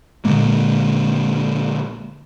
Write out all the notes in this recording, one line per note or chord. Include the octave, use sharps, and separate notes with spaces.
A#2 D3 G#3 A#3